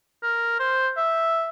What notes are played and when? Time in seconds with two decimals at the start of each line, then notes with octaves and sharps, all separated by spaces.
0.23 A#4
0.59 C5
0.97 E5